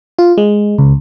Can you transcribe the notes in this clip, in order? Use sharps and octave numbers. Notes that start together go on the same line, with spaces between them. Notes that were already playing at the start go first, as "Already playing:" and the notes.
F4
G#3
C#2